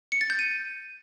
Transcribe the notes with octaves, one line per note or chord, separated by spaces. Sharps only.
C#7
A6
G6
D#7